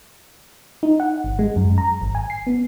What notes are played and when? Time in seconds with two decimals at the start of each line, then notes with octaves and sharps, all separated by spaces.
0.83 D#4
1.00 F#5
1.24 G#1
1.39 G#3
1.56 F#2
1.78 A#5
2.01 G#1
2.15 G#5
2.30 C7
2.47 B3